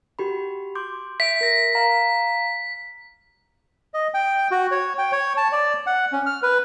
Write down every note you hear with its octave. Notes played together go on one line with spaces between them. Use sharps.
F#4 G4 B5
C6 D6 G6
E5 B6 D7
A#4 A#6
F5 A#5
D#5
G5
F#4
C#5
G5
C#5
A5
D5
F#5
C#4
F6
B4